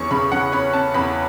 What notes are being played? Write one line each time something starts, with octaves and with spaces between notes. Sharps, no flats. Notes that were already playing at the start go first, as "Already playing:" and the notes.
Already playing: E2 C#4 C#6
C#3 B5
C#3 F#5
C#4 B5
C#4 A5
E2 B5